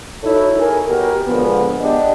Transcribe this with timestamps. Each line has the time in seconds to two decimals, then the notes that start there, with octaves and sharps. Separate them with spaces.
0.24 D#4 E4 F#4 A4 C#5
0.59 G#4 A#4
0.88 B2 G4 A#4
1.27 D3 F3 G#3 B3
1.81 B3 D4 G4 D#5